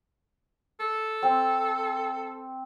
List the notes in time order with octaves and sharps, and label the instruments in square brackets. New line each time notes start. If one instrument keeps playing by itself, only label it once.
[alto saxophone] A4
[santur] C4